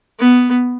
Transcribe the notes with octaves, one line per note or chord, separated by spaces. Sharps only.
B3